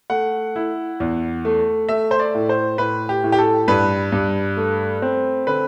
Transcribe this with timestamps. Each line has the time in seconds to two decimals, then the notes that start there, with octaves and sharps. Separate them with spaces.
0.10 A3 F#5
0.56 E4
1.00 E2
1.45 A3
1.89 A3 E5
2.11 C5
2.19 D5
2.34 A2
2.49 C5
2.78 A2 B4
3.09 G4
3.24 A2
3.32 G4
3.38 A4
3.68 G2 B4
4.12 G2
4.57 A3
5.02 C4
5.47 D3 B4